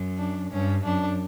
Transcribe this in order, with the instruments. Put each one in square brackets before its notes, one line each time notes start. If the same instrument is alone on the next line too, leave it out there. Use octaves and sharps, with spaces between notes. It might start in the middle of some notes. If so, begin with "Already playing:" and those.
Already playing: [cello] F#2
[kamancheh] D4
[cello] G2 [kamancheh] C#4
[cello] F#2 [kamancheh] D4